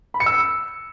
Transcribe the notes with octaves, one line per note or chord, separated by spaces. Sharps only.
B5
C#7
E6